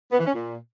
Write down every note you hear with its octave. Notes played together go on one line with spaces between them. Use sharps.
B3
E3
C#4
A#2